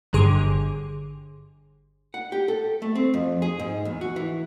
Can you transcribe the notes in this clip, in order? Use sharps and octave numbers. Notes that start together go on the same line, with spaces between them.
G1 G2 D3 G#4 C6 D6
F#5
G4
A4
A3
C4
F2
G#4
G#2
E2
F#4
E3